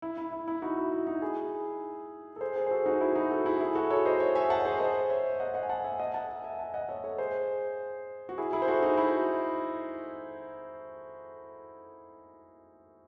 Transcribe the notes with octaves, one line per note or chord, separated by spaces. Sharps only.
E4
E4
E4
E4
D#4 F#4
E4
E4
D#4 F#4
E4 G#4
A4
G#4 C5
G#4 C5
C5
F#4 A4
D#4 F#4
E4
D#4 F#4
F#4 A4
E4 G#4
E4 G#4
F#4 A4
A4 C#5
C5 D#5
C#5 E5
E5 G#5
F#5 A5
C#5
G#4 C5
C5 D#5
C#5 E5
D#5 F#5
D#5 F#5
G#5
F#5 A5
E5 G#5
D#5 F#5
F#5 A5
E5 G#5
E5 G#5
F#5 A5
D#5 F#5
C#5 E5
A4 C#5
G#4 C5
F#4
E4 G#4
E4 G#4
C5
F#4 A4
D#4 F#4
E4